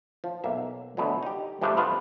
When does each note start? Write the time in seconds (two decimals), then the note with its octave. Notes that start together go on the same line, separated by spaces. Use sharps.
0.24 F3
0.44 B1 A#3 E5
0.97 D2 B2 F#3
1.23 D#4 G4
1.61 G2 C3 F3 G#3 A3 D4
1.77 F2 B3 F4 B4 F5